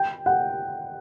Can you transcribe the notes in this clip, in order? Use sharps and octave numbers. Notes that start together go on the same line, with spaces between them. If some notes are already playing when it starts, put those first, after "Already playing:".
Already playing: G5
F#5